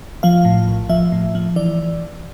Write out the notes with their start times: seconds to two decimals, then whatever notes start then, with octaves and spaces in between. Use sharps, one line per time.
0.23 F3 F5
0.45 A2
0.67 A#1
0.89 F3 E5
1.12 A2
1.35 F3
1.56 E3 D5